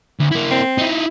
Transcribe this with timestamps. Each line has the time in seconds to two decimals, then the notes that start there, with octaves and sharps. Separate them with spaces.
0.19 D2
0.31 A#3 E4
0.51 C4
0.78 D#4 E4